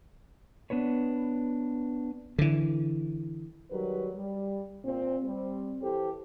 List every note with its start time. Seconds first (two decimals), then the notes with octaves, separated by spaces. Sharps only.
0.70 B3 D4 B4 C#5
2.39 D3 E3
3.71 D#3 F#3 G3 A#4 B4
4.15 G3
4.85 A#2 C4
5.24 G3 C4
5.82 E3 G4 A4 C5